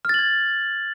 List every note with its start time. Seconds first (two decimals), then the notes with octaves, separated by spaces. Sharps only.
0.05 F6
0.09 A6
0.14 F#7
0.19 G#6